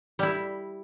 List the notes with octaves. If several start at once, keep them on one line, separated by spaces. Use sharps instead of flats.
G3 E4